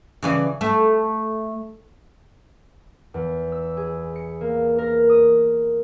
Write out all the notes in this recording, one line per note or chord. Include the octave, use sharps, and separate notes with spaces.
C#3 E3 D5
A3
E2
E6
G#4
C#7
A#3
A#4
D#6